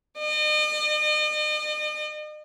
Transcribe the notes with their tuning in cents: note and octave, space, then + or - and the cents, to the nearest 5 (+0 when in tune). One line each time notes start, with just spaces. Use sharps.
D#5 -40